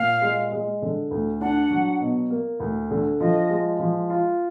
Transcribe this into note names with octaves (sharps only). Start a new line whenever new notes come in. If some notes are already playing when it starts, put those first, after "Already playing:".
Already playing: A#2 F5
G#3
G#3
D3
D2
D4 F#5
F#3
B2
A#3
D2
D3
F3 D#5
G#3
F3
F4